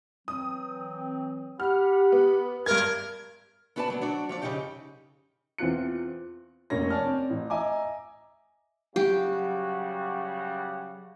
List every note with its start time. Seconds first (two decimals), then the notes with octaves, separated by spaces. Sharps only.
0.28 E3 F#3 C4 D#6
1.60 G4 F#5 B5 F6
2.12 B3
2.66 G2 A#4 G#6
3.76 B3 E4 F#4 B4 D5 A5
3.88 D2 F#3 B3
4.01 F#3 D4 F#4 D5
4.29 F3 C#5 D5
4.42 F#2 C#3 D4 D#4 G4 G5
5.58 E2 C4 F4 F#6 C#7
6.70 F1 A2 A#3 C#4 C#5 A#6
6.90 C#5 D5 G#5 A5 F6
7.05 C4
7.30 A1
7.50 D#5 E5 G#5 A#5 D6
8.96 C#3 F#3 G3 F#4 G4